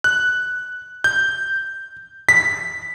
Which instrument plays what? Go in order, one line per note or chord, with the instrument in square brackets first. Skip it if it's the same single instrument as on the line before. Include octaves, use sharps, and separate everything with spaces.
[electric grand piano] F#6
G6
B6